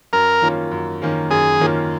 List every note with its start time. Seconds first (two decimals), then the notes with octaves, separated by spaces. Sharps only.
0.13 F#2 A#4
0.42 D#3 A#3 C#4 F4
0.71 F#2
1.02 D#3 A#3 C#4 F4
1.30 F#2 G#4
1.60 D#3 A#3 C#4 F4